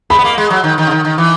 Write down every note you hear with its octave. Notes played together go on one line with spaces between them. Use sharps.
G#3 B5
B3
A#3
G#3
F#3
D#3
D#3
C#3
D#3
D#3
E3